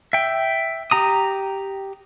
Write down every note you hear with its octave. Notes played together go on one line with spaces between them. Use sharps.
E5 G5
G4 A#5 D#6